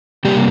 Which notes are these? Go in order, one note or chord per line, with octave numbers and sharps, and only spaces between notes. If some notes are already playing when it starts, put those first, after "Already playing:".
C3 G3 A#3 G4